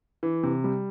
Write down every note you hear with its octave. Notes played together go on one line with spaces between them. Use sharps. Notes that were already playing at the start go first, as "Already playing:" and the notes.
E3
C3
G3